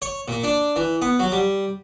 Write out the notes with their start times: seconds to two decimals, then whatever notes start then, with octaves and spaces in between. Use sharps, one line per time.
0.02 C#5
0.28 A#2
0.43 D4
0.76 E3
1.02 B3
1.19 F#3
1.32 G3